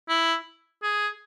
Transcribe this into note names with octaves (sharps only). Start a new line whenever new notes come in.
E4
G#4